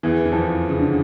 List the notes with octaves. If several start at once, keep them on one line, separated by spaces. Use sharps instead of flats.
E2 E3
E3
F2 F3
C#3
D3